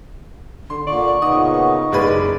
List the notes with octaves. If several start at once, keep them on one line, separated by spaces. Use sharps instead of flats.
D3 C6
A#2 D3 D5 C#6
A#2 C#3 B3 D#4 D#6
F#1 G#3 B4 D5